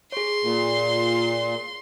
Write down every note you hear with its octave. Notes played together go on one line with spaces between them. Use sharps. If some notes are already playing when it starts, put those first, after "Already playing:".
G#4 C#5 C6
A#2